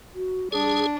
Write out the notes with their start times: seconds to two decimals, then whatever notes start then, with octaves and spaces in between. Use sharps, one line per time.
0.14 F#4
0.52 G3 D4 G#4